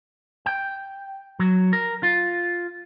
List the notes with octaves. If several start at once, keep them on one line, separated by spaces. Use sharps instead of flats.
G5
F#3
A#4
F4